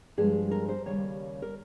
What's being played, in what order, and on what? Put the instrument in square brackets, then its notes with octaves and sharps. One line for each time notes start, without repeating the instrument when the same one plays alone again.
[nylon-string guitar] G2 F3 G#3 G#4
A#4
C5
D#2 C#3 G3 C#5
A#4